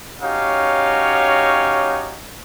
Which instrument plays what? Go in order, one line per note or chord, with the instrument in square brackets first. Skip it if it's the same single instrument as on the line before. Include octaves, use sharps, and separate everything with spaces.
[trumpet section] C#4 D#4 F#4 G4 C#5 F5